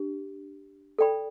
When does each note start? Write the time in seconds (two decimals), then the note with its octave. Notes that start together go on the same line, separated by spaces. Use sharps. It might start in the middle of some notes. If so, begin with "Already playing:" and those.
Already playing: D4 G4
0.99 A4 D5 G5 B5